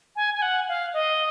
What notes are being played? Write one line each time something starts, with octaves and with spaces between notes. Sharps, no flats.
G#5
G#5
F#5
F5
D#5